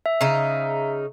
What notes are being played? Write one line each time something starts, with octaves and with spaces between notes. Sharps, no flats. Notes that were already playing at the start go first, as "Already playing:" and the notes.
E5
C#3 D#4